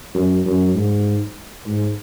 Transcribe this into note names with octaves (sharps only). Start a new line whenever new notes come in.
F#2
F#2
G#2
G#2